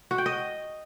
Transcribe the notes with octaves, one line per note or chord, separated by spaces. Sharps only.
F#4
G5
D#5